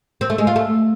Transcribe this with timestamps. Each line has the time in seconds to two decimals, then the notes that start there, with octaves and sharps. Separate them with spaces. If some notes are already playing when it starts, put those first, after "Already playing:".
0.21 C4
0.30 A3
0.38 G#3
0.47 F4
0.56 A3